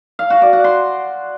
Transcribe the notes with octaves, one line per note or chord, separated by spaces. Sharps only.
F5
F#4
D5
F#5
C6